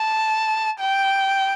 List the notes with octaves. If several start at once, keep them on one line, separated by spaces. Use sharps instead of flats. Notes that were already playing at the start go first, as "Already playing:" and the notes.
Already playing: A5
G5